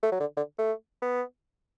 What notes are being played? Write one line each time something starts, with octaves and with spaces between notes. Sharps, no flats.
A3
F#3
D3
D3
A3
B3